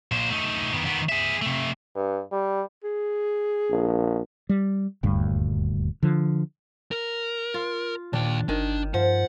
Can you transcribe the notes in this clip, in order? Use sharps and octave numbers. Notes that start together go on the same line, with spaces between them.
A#2 C5
A3 D#4
D#3 B3
D#3 B3
G#4 E5
C3 A3
G2
G3
G#4
A#1
G3
D#1 D2 G2
D3 F3
A#4
F4
D#2 A#2 D4 G5
G1 D#3 D4
G2 F3 F#5